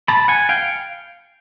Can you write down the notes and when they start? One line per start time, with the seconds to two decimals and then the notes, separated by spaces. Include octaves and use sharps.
0.08 A5 B5
0.28 F#5 G#5
0.49 F5 G5